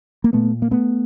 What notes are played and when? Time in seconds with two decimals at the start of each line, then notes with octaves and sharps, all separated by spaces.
0.24 A#3
0.33 A#2 A3 B3
0.62 A#3
0.71 A3 B3